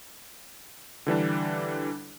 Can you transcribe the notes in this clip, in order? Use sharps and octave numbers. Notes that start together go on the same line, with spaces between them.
D3 E3 G3 D4